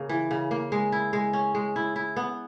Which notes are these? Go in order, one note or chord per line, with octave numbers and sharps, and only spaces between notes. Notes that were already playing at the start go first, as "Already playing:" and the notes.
Already playing: C#3 A#3
E3
C#3
A#3
G#3
E4
G#3
C#4
G#3
E4
E4
B3